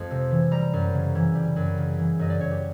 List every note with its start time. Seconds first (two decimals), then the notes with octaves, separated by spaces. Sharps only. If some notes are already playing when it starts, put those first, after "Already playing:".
Already playing: F2 G#3 C6
0.11 C3
0.31 E3
0.51 G3 A#5
0.73 F#2
0.93 C#3
1.15 E3
1.35 G3
1.56 F#2
1.78 C#3
1.98 E3
2.19 F#2 D#5
2.30 D5
2.40 F#2 C#5
2.51 G4